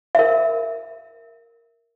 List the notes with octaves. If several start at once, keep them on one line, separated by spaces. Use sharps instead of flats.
A#4 E5